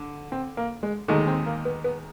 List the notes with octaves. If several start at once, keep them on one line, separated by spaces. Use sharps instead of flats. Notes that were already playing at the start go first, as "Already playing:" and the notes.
Already playing: D3
C4
A#3
G#3
D#2 D#3 G#3 A3
C4
A#3
B3
B3